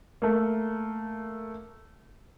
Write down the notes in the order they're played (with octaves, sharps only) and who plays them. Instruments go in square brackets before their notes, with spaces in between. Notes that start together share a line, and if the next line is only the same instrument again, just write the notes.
[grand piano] A3 A#3